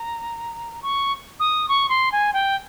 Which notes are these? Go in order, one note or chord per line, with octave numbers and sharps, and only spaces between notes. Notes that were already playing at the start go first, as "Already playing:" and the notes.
Already playing: A#5
C#6
D#6
C#6
C6
G#5
G5